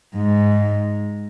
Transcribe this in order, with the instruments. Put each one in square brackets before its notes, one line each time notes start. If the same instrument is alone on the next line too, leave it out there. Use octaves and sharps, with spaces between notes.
[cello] G#2